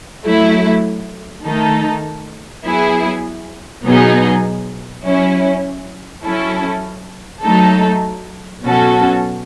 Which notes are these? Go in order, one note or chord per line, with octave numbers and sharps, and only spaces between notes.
F#3 A3 E4
D#3 A3 D#4 A4
F#3 B3 E4 G#4
B2 F#3 B3 D#4 G#4
F#3 C#4 E4
F#3 C#4 E4 A4
F#3 A3 D#4 A4
B2 F#3 C#4 F#4 A4